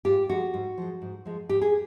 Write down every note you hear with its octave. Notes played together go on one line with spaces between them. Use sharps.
G#2 F4 G4
F3 G#3 F#4
G#2
F3 G#3
G#2
F3 G#3
G#2 G4
G#4